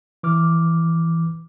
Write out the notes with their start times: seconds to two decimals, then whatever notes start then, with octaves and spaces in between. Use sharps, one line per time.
0.23 E3 D6 F6